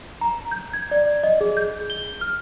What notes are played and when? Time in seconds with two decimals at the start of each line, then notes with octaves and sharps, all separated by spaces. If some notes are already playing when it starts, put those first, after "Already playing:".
0.21 A#5
0.51 G6
0.73 G#6
0.91 D5
1.24 D#5
1.41 G#4
1.57 G6
1.90 G7
2.21 F6